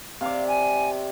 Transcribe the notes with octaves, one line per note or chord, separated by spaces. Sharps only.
C3 D5 F5
G#5